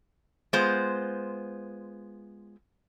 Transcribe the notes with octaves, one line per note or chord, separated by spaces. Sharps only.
G#3 B3 F4 C5